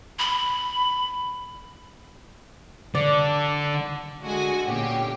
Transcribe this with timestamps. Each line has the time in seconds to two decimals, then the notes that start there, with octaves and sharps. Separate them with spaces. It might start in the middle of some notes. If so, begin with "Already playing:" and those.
0.19 B5
2.95 D3 D5
4.21 D3 G#3 F#4 G#5
4.67 A#2 D3 B3 C#4 G4